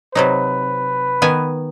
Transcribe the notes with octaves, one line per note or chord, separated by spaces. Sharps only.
C3 F#3 D#4 B4
D#3 B3 G#5